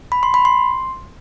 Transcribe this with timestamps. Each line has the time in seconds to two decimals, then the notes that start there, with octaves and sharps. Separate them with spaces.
0.12 B5
0.23 C6
0.34 B5
0.45 C6